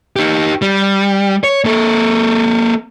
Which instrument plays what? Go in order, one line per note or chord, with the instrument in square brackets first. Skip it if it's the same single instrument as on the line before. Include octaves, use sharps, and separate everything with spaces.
[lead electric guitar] D#4 G4
G3
C#5
A#3 A4